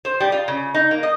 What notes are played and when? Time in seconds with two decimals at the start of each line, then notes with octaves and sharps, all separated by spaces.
0.05 C5
0.20 G3
0.32 F4
0.48 C#3
0.74 D#4
0.91 A#3
1.03 D#5